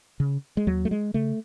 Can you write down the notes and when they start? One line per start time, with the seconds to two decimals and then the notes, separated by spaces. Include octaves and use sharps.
0.20 C#3
0.57 G#3
0.67 D#2 F#3
0.85 A3
0.91 G#3
1.14 C#3 A3